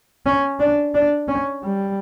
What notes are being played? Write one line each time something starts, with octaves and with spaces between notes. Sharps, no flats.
C#4
D4
D4
C#4
G3